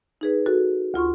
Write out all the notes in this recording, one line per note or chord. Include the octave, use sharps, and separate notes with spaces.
D#4 G#4 B4
F#4 A4
D2 F4 C6 C#6